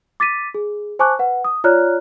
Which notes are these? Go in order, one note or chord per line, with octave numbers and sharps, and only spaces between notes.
D6 A6 B6 D#7
G#4
C5 G#5 A5 C#6 D6 F#6
B4 F#5
D#6
F4 C#5 D5 A#5 F6 F#6